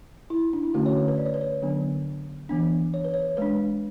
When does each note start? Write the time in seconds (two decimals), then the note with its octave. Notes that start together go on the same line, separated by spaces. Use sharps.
0.30 E4
0.53 D4
0.63 E4
0.74 D3 A3 C#4 F#4
0.86 C#5
0.97 B4
1.08 B4
1.18 D5
1.26 C#5
1.34 B4
1.41 C#5
1.62 D3 F#3 B3 D4
2.49 E3 B3 D4
2.94 C#5
3.04 B4
3.14 C#5
3.37 G#3 D4 B4